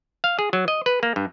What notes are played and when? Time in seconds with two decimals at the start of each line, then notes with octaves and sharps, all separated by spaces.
0.24 F5
0.39 G#4
0.53 F#3
0.68 D#5
0.86 B4
1.03 A#3
1.16 G2